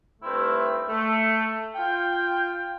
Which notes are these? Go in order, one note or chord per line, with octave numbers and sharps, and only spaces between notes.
G2 D#3 A3 C4 E4
A3
F4 G5